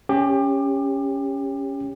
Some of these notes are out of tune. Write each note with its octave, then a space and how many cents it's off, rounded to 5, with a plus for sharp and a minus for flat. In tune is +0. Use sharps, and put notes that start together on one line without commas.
C#4 +0 G4 +25